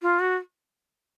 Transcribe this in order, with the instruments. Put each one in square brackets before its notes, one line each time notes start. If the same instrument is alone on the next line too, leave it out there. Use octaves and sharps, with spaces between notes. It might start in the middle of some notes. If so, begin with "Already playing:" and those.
[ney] F4
F#4